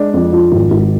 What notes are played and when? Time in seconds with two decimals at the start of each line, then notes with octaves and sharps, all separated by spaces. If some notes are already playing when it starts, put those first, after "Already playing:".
Already playing: G#3 D4
0.14 F2
0.32 F3
0.52 G#1
0.71 G#1